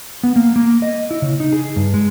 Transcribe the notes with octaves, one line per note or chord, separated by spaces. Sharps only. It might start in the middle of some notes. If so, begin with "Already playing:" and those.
B3
A#3
A#3
D#5
E4
C#3
D#4
G#4
G2
G#3